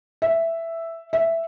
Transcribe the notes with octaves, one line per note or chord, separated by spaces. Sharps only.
E5
E5